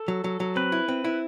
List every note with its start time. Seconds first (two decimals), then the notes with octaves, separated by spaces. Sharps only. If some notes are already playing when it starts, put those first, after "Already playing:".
Already playing: A4
0.08 F#3
0.24 F#3
0.40 F#3
0.56 C4 B4
0.72 E4
0.88 C4
1.04 E4